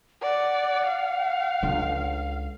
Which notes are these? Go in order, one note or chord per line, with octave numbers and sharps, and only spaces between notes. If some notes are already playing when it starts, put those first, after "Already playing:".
D5 F#5
F5
C#2 D3